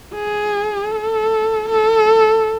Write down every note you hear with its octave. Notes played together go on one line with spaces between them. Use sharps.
G#4
A4
A4